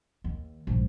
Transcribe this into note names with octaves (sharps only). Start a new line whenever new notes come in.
D#2
A#1 G#2